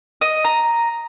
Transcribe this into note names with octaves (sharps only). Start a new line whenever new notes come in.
D#5
A#5